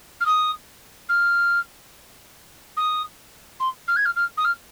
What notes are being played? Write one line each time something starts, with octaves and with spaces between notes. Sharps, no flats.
F6
D#6
F6
D#6
C6
F6
G#6
F6
F6
D#6
F6